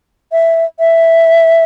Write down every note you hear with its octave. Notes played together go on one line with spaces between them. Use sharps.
E5
E5